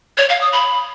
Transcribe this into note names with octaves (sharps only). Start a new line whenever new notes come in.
C#5
F5
D#6
B5